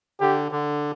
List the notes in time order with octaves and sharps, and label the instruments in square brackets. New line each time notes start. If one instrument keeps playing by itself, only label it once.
[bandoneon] D3 [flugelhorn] G4
[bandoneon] D3